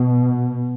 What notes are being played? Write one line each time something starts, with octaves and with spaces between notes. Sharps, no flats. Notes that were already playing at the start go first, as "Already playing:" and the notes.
Already playing: B2